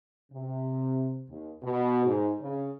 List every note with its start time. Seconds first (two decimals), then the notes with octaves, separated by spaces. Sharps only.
0.31 C3
1.28 D#2
1.62 B2
2.05 G#2
2.40 C#3